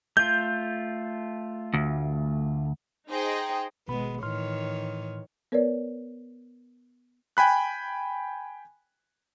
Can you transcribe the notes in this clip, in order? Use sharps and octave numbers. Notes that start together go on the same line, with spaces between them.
A3 F4 G6
D2
D#4 G#4 C5 D#5 G5
G#1 B2 G#3 B3 B5
A2 D#3 E3 C#5 C6 F6
B3 A#4 B4 C#5 D5
G5 G#5 B5 F#6